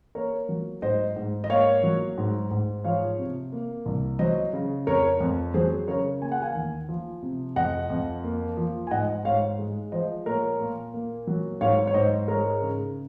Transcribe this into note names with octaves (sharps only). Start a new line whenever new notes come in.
A#3 A#4 C#5
F#3
G#2 C5 D#5
G#2
D#5
A#3 C#5 F5
F#3
G#2
G#2
F3 C#5 F5
C3
A#3
C2
F#3 C5 D#5
C#3
F2 A#4 C#5
F2
F#3 G#4 C5
C#3 A#4 C#5
A#3 G#5
F#5
F5 G#5
D#2
F3
C3
F2 D#5 F#5
F2
A#3
F3
G#5
G#2 D#5 F#5
G#2 C#5 F5
G#3
F3 C5 D#5
A#2 A#4 C#5
A#2
A#3
F#3
G#2 C#5 F5
C#5
G#2 C5 D#5
G#3 A#4 C#5
C#3